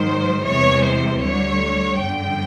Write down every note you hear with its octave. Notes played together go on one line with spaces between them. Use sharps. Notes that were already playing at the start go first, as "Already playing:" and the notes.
Already playing: G#2 D#3 F#3 C5
E2 C3 E3 G#3 C#5
C5
D2 D3 G3 C#5
G1 F#2 D3 F3 G5